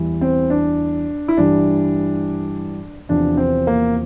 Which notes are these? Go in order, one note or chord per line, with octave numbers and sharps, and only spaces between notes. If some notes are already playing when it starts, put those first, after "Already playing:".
Already playing: E2 E3 G3
C4
D4
E4
G2 E3 G3 D4
E2 C3 F3 D4
C4
A#3